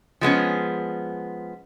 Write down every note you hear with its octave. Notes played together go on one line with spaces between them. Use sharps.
F3 G#3 B3 C#4